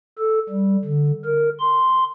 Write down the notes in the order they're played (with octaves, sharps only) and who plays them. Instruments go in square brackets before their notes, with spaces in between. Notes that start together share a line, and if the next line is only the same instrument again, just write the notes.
[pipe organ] A4
G3
D3
A#4
C6